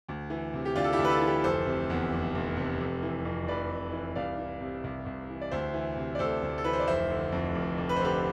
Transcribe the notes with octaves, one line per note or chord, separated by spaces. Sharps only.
D2
E3
C3
G4
D2 D4 F4
A4
E4 G4
D2
B4
F4 A4
E3
G4 B4
F1 A4 C5
C3
E2
F1
F1
C3
F1
E3
F2
F1 B4 D5
F1
E3
C2 D5 F5
E3
C3
C2
C2
E3
D5
D2 C5 E5
E3
C3
D5
D2 A4 C5
D2
A4
E3 B4
C5
D5
F1 C5 E5
D3
F2
F1
F1
B4
C5
D3 G4 B4